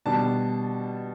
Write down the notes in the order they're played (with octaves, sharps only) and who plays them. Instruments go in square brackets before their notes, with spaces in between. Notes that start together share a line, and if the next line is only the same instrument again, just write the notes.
[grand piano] B2 G3 D4 A5